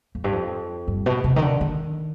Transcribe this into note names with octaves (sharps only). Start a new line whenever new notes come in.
F2
G2
F2
G2
B2
C3
D#3
D3
D#3